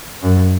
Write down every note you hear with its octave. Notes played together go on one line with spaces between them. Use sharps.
F#2